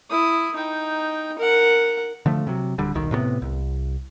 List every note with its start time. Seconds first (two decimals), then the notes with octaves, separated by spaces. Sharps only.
0.10 E4 D#6
0.56 D#4 G5
1.39 A#4 F#5
2.26 D3 F3 A3
2.47 C3 F#3
2.78 D1 D3 G3
2.94 D#1 B1 D#3
3.11 A2 C3 G3 B3
3.42 C2